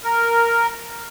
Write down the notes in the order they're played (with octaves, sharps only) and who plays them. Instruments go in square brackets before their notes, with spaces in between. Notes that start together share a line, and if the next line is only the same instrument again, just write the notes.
[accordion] A#4